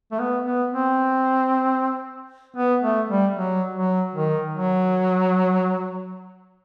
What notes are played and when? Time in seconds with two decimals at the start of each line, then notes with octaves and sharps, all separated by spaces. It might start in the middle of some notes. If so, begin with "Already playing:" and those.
0.12 A3
0.20 B3
0.46 B3
0.72 C4
2.56 B3
2.82 A3
3.09 G3
3.35 F#3
3.75 F#3
4.15 D#3
4.54 F#3